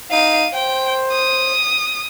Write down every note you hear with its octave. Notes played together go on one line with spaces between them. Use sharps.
D#4 F5 D#7
C5 G5
D#6